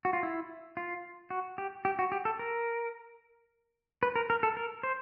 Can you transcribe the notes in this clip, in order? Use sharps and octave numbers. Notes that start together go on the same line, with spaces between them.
F#4
F4
E4
F4
F#4
G4
G4
F#4
G4
A4
A#4
B4
A#4
A#4
A4
A#4
C5